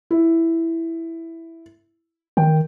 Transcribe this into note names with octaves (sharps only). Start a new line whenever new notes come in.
E4
D#3 G5